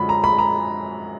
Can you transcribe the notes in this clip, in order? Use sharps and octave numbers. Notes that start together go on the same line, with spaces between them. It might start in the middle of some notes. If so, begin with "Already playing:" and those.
Already playing: F#2 D3 F3 G#3 B5
A#5
B5
A#5